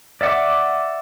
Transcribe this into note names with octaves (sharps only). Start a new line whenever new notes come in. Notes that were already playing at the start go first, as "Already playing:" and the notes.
D5 E5 F#5 D6